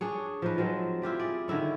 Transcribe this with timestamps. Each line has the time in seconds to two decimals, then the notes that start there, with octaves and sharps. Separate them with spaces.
0.01 D4 G#4 C#5
0.42 F3 D#4 B4
0.58 F3 F#3 G#3 C4
1.02 E4 F4 G4 D5
1.20 G#4 D5
1.48 D3 D#3 E4 C#5